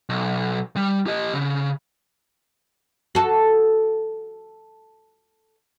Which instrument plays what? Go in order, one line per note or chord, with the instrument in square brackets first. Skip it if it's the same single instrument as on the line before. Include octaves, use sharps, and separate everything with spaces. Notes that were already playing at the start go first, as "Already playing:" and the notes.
[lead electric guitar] B1
G3
G4 D#5
C#3
[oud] F#4 A4